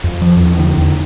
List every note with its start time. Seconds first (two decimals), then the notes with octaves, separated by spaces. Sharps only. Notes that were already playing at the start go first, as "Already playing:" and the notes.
0.04 F2
0.21 F3
0.40 E2
0.59 D3
0.77 E2